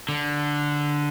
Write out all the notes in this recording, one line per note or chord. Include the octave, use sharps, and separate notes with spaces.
D3